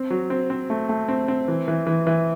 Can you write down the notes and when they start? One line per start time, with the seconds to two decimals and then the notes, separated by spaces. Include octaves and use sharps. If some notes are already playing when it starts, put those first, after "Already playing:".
Already playing: C4
0.10 F#3
0.30 C4
0.50 C4
0.70 A3
0.89 A3
1.08 C4
1.28 C4
1.48 E3
1.68 E3
1.87 E3
2.07 E3